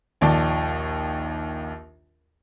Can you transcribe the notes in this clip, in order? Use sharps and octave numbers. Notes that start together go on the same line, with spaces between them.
A#1 D#2 D5 G5 A5